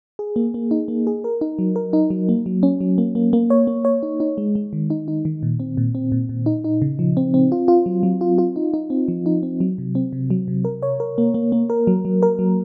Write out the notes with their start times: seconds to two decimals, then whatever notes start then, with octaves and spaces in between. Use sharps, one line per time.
0.19 G#4
0.36 A#3
0.54 A#3
0.71 D#4
0.88 A#3
1.07 G#4
1.24 A#4
1.41 D#4
1.59 F#3
1.76 A#4
1.93 D#4
2.10 F#3
2.29 A#3
2.46 F#3
2.63 C#4
2.81 F#3
2.98 A#3
3.15 A#3
3.33 A#3
3.50 C#5
3.67 A#3
3.85 C#5
4.03 D#4
4.20 D#4
4.38 G#3
4.55 G#3
4.73 D#3
4.90 D#4
5.08 D#4
5.25 D#3
5.43 A#2
5.60 C4
5.77 A#2
5.95 C4
6.12 A#2
6.29 A#2
6.46 D#4
6.64 D#4
6.82 C#3
6.99 F3
7.17 C4
7.34 C4
7.52 F4
7.68 F4
7.86 F#3
8.03 F#3
8.21 F4
8.38 F4
8.56 D#4
8.74 D#4
8.90 C4
9.08 F3
9.26 D#4
9.43 C4
9.60 F#3
9.78 C3
9.95 C4
10.13 C3
10.30 F#3
10.48 C3
10.65 A#4
10.83 C#5
11.00 A#4
11.18 A#3
11.34 A#3
11.52 A#3
11.70 A#4
11.87 F#3
12.05 F#3
12.23 A#4
12.39 F#3